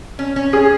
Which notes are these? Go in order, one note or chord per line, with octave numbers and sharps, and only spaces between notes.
C#4
C#4
C#4 G#4